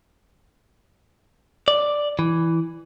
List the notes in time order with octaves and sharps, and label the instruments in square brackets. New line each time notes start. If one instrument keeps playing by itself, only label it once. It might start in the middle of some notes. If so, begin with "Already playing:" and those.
[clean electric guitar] D5
E3